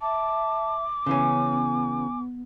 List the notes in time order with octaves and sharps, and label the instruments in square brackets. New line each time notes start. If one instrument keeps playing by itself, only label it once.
[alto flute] E5 [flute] A5 [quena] D6
[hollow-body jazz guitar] C#3 E3 C#4 [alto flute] B3 [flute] G#5